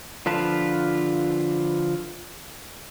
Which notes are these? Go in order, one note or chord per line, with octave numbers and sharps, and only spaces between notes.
D3 F3 F4 B4 A5